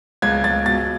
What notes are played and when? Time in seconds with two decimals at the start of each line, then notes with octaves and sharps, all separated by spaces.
0.22 C#2 G#6
0.44 C#2 A6
0.66 B2 A6